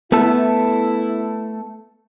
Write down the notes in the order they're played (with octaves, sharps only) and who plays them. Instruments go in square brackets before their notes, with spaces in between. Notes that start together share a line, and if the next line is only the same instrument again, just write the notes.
[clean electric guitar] A3 A4 [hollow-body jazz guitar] B3 [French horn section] E4